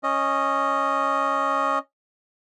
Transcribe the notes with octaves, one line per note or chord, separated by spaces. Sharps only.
C#4 D#5